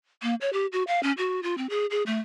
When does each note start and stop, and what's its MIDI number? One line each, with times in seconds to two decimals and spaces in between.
0.23 0.35 58
0.41 0.52 73
0.53 0.66 67
0.72 0.83 66
0.87 1.02 77
1.03 1.12 61
1.18 1.40 66
1.43 1.55 65
1.58 1.67 60
1.70 1.86 68
1.91 2.03 68
2.06 2.19 57